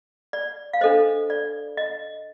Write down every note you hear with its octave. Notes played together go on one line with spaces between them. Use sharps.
D5
F5
D4 A4 C5 D#5
D5
D#5